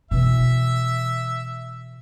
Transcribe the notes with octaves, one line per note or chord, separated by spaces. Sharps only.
B2 E3 E5